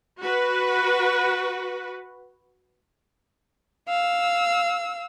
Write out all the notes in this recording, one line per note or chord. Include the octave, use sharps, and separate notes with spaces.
F#4 B4
F5 E6